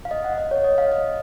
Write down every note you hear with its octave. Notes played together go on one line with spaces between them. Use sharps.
F5
D#5
F#5
D#5
C#5
D#5
F5
D#5